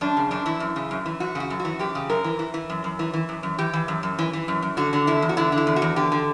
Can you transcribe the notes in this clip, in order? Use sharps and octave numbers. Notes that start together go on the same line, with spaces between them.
F#2 D4
C#3
F#2 D4
E3 E4
F#2
C#3
F#2
E3
F#2 F#4
C#3 F#4
F#2
F#4
E3
F#2 G4
C#3
F#2 A#4
E3
E3
E3
F#2
F#2
E3
E3
F#2
F#2
E3 G4
E3
F#2
F#2
E3
E3
F#2
F#2
D3 F#4
D3
E2 E4
E2
F#4
D3 E4
D3
E4
E2
F#4
E2
D3 G4
D3